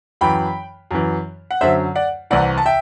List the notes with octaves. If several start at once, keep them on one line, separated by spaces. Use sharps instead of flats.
F#2 E3 G5 B5
F#2 E3
F#5
F#2 D3 F#3 C5 E5
D5 F#5
C2 C3 E3 D5 F#5
A5
E5 G5